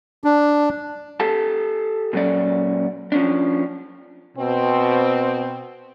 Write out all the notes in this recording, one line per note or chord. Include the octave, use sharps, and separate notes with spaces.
D4
G4 A4 F5 A5
A#2 F#3 C#4 D5
F3 C#4 D4
B2 C4